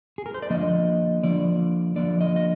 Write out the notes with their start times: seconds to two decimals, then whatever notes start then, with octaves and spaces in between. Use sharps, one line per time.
0.18 G#4
0.26 A#4
0.34 C5
0.42 D5
0.50 D3 F3 A#3 D#5
1.23 D3 F3 A#3 D5
1.96 D3 F3 A#3 D5
2.21 D#5
2.36 D#5